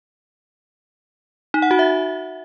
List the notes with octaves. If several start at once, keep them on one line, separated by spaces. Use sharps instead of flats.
D#4
F#5
F#4
E5